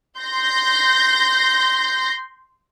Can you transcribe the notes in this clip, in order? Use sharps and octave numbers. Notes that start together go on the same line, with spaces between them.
C6 G6 A#6 C7